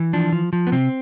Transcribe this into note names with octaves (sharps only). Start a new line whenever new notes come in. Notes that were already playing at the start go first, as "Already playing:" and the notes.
Already playing: E3
F3 D4
F3
F3
B3
C3 C4